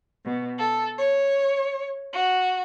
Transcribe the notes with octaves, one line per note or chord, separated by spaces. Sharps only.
B2
A4
C#5
F#4